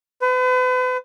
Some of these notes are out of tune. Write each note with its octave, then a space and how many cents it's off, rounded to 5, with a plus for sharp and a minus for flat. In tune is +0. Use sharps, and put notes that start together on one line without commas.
B4 +40